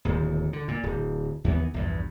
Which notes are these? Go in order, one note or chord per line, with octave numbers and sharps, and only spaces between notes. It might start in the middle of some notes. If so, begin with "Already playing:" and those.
D1 D#2
D3
A#2
D1
D#2 E3 B3
A#1 E2 G2